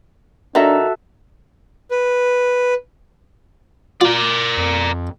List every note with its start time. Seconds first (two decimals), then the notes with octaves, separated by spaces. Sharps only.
0.55 D#3 D4 F#4 A4 E5 A#5
1.91 B4
4.01 F4 A#4 D5
4.57 F2